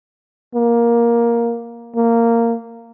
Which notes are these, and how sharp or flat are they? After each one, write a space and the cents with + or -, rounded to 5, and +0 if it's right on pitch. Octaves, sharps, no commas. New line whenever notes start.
A#3 +10
A#3 -10